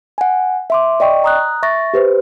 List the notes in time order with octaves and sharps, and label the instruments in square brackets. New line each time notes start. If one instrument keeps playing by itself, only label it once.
[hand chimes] F#5 G#5
E5 C6 D6
D5 D#5 G5 C#6
A#5 D#6 F#6
E5 C#6 A6 A#6
G4 B4 C5